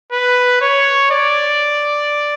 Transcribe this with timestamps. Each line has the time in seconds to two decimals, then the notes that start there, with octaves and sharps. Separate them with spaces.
0.12 B4
0.61 C#5
1.11 D5